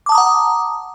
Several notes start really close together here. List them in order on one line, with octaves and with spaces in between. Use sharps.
D6 A5 D#6 A#5 F#5